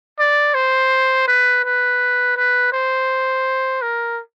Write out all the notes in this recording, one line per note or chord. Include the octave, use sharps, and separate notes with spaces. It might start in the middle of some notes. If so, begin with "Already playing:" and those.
D5
C5
B4
B4
B4
C5
A#4